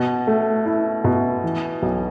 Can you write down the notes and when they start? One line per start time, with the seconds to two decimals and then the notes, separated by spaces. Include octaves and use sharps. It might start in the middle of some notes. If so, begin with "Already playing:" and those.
Already playing: B2
0.27 A3
0.66 E4
1.04 B2
1.44 E3
1.82 B1